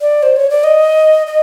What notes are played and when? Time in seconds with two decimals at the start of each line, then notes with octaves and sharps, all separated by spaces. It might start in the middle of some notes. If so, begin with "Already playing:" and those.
0.01 D5
0.23 C5
0.36 C#5
0.50 D5
0.64 D#5
1.27 D#5